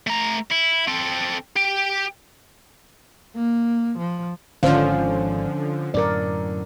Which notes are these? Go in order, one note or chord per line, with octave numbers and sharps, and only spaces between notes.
A3 A#5
E4
C4 A4
G4
A#3
F3
G#1 D3 F3 C#4 C5 F5
F#2 A2 D3 A#4 D5